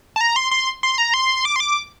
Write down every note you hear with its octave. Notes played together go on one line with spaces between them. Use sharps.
A5
A#5
C6
C6
C6
A#5
C6
D6
C6
D6